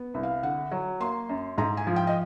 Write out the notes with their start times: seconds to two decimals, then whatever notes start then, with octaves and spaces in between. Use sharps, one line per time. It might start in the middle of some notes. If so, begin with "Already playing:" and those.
Already playing: B3
0.14 C2
0.23 F5
0.43 D3 F#5
0.72 F#3
1.00 A#3 C6
1.29 F#2
1.58 G#2 A#5
1.77 G#5
1.87 F3
1.96 G5
2.07 D#5